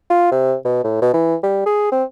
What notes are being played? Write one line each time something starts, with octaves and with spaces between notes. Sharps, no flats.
F4
C3
B2
A2
B2
E3
G3
G#4
C4